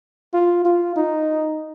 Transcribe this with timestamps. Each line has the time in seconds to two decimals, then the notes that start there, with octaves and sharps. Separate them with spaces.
0.33 F4
0.65 F4
0.96 D#4